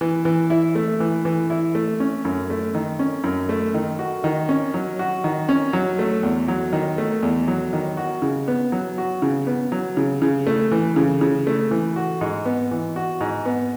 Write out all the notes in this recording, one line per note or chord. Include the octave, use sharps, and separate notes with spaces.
E3
E3
E4
A3
E3
E3
E4
A3
C#4
F#2
A3
D#3
C#4
F#2
A3
D#3
F#4
D#3
C#4
F#3
F#4
D#3
C#4
F#3
A3
E2
F#3
D#3
A3
E2
F#3
D#3
F#4
C#3
B3
F#3
F#4
C#3
B3
F#3
C#3
C#3
A3
E3
C#3
C#3
A3
E3
F#4
G#2
B3
E3
F#4
G#2
B3